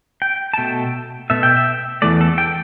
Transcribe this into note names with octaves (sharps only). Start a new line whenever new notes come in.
G5
A5
B2 A3 G5
B2 A3 E5
G5
E5
E2 E3 A3 D5
A4
G5